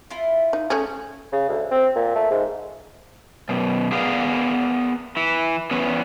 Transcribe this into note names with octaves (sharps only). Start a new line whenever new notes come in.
E4 F4
D#4
A3 C#4 G#4
C#3
D2
C4
A#2
A3
G#2
F#2 B2
B3 G#4 A#4 D5 F5
E3 E4
E2 B3 C#4